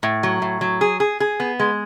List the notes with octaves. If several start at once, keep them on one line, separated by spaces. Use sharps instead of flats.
A2
F#3
A2
F#3
G#4
G#4
G#4
B3
G#3